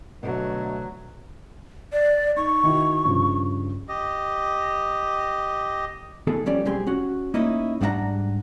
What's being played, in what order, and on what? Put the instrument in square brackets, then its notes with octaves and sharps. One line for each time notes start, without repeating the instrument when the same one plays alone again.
[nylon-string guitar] B2 [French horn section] D3 A3 [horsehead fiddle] F#3
[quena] D5
[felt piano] D#4 [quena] C#6
[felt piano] D#3 E4 F#4
G2 C#3 F3
[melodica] G4 D#5
[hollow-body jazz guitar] D#3 B3 G#4 A4
F3 G3 C#4 D5
B1 G3 C4 G4 G#4 C6
C#4 F#4
A#3 C#4 D#4 E4 C#5 D#5
G#2 G3 D4 F5 F#5 A#5